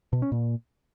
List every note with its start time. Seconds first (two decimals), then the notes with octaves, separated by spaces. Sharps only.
0.13 B2
0.22 C#4
0.32 A#2